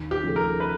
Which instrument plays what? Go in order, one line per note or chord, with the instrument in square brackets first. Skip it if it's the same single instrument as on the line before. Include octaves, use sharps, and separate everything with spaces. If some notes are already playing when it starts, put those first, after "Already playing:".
Already playing: [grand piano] D#2
[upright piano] G4
[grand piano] C#3 F3 A3
[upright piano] A#4
B4